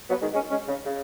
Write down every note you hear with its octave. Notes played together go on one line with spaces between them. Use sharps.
F#3 B3
D#3 G#3
G#3 C#4
G#3 C#4
C#3
C#3